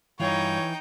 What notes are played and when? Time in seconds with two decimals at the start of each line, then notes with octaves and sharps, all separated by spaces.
0.20 G2 E3 D#4 F4 C#5 G5